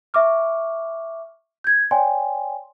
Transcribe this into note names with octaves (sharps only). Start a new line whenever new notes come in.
E5 C#6 D6 F6
G6 G#6
C#5 D5 G5 G#5 C6